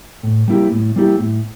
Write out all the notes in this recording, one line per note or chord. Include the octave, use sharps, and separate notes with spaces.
A2
G3 A#3 E4 G4
A2
G3 A#3 E4 G4
A2